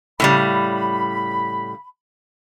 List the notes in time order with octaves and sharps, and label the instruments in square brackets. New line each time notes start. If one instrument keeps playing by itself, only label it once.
[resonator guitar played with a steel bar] A2 C#3 G3 [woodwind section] B5